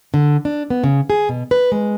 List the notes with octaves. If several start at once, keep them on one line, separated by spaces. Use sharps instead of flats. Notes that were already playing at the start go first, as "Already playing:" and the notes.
D3
D4
B3
C#3
G#4
B2
B4
G#3